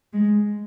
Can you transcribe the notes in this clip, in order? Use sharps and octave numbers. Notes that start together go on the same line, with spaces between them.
G#3